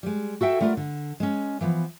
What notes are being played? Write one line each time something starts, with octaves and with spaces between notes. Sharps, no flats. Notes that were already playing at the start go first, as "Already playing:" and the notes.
G3 G#3
F#4 A4 E5 G5
G3 A3 F4 A#4 D5 F#5
D3
G#3 C#4
E3 F3 B3